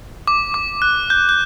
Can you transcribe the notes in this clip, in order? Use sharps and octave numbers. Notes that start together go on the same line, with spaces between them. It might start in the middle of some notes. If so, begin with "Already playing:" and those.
D6
D6
F#6
G6
G6